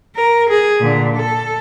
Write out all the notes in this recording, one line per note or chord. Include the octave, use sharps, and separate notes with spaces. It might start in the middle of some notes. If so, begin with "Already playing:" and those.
A#4
G#4
A#2 D3
A4